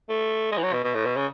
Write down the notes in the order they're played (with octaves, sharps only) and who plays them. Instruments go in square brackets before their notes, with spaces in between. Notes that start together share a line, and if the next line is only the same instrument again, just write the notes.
[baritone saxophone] A3
G#3
E3
F#3
B2
B2
A2
B2
C#3